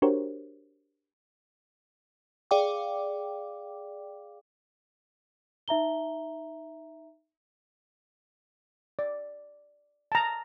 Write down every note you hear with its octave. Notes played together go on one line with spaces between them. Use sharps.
D4 F#4 G4 A#4 C5 C#5
G#4 D5 F5 G5 D6
D#4 E5 A#5 G7
D5
A5 A#5